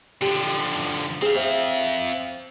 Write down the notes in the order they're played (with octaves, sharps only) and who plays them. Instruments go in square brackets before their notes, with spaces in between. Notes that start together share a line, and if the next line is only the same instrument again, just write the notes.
[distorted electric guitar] D3 F3 [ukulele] G4
[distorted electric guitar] C4 F5 [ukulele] G#4
[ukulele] C5 E5